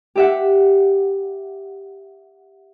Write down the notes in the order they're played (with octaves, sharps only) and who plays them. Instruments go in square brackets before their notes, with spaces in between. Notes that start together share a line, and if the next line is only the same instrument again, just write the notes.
[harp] G4 E5 F#5